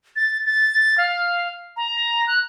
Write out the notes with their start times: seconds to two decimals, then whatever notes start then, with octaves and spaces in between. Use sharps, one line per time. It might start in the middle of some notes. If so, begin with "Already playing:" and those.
0.16 A6
0.45 A6
0.98 F5
1.77 A#5
2.27 F#6